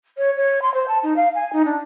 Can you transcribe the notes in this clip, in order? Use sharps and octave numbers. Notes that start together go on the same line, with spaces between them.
C#5
C#5
C6
C5
A5
D#4
F5
G#5
D#4
D4